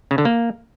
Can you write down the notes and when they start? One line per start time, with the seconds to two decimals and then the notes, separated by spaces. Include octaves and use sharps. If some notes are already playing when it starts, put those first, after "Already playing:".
0.11 C#3
0.18 D3
0.25 A#3